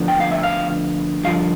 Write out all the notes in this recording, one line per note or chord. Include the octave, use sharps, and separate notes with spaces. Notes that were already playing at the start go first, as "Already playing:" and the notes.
Already playing: D2 D3 F3 B3
G5
F5
E5
F5
G2 D3 F3 F5